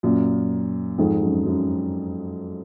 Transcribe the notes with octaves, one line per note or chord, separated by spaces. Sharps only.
F#2 A#2
F2 G#2
F#2
F#2